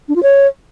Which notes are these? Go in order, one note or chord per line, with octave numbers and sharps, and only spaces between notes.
D4
F4
C#5